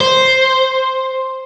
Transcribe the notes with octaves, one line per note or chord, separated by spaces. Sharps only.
C5